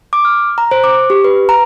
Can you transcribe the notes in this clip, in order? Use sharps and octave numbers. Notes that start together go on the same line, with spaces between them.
D6
F6
A#5
C5
D6
G4
B4
A#5